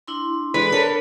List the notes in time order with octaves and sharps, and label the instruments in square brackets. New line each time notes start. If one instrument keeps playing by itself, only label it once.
[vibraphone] D4 E4 C6
[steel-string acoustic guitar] E3 G#3 [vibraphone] G#4 A4 D5 [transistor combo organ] B4
[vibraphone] D4 C#5 [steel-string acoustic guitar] A4 A#4